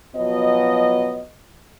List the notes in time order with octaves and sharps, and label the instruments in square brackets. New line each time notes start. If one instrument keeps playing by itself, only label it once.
[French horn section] B2 F3 F#3 B3 D#5